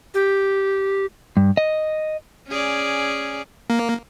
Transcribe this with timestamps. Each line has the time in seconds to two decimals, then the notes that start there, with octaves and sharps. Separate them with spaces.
0.14 G4
1.37 G2
1.57 D#5
2.48 C#4 G#4 D5
3.70 A#3